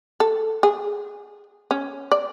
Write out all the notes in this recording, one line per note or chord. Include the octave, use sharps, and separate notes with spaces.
A4
G#4
C#4
D5